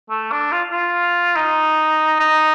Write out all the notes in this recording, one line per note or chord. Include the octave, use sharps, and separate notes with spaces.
A3
D4
F4
F4
D#4
D#4